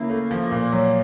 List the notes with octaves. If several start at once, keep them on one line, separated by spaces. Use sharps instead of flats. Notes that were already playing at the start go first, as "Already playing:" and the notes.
Already playing: C#3 A#3 E4
A3
F3
A#2
F#3